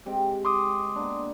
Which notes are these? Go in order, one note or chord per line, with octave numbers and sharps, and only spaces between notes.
G#3 C4 G4
C6 D6 D#6
A#3 B3 D4